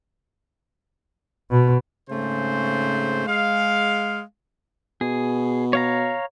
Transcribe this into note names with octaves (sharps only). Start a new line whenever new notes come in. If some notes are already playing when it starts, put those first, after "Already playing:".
B2
G#2 C#3 A3 C4 C5
G#3 F5
B2 G#4
C#5 F5 A#5